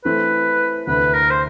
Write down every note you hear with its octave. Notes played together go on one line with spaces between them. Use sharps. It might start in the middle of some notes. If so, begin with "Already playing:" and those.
E3 A3 C4 E4 B4
D2 C3 E3 A3 D4 B4
A#4
C5